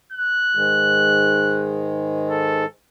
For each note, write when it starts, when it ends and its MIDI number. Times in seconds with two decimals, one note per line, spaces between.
0.12 1.65 90
0.55 2.65 44
0.55 2.65 51
0.55 2.65 56
2.30 2.66 69